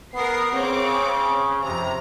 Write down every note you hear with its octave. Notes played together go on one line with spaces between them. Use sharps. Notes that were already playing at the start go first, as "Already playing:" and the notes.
B3 A#4 C7
C#3 C4 C#5 D6
F2 C3 A#5